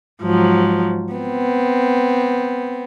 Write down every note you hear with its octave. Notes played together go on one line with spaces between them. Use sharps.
G#2 F3 F#3
B3 C4